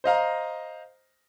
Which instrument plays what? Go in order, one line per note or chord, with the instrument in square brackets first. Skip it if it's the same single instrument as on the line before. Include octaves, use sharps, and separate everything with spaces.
[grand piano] C5 D#5 F5 A#5